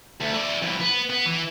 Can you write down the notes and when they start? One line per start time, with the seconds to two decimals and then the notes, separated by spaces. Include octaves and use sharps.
0.20 D2
0.34 E4 D5
0.62 F2 E4
0.80 B3
1.10 B3
1.26 E3